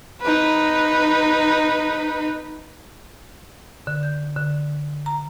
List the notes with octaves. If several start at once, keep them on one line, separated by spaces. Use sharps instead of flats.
D#4 B4
D3
G6
D3
A#5